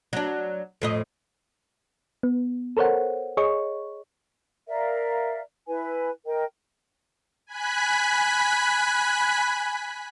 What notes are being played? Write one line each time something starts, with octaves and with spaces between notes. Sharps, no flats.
F#3 D4
F2 A2 D#5
B3
A4 A#4 C5 C#5 F#5
G#4 C#5 D#5 C#6
A#4 D5 E5 F5
E4 B4 G#5
A#4 D#5 G5
G#5 B5 F#6 B6